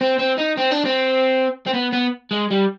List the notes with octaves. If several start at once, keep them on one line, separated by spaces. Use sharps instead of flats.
C4
C4
D#4
C4
D4
C4
C4
B3
B3
G#3
G3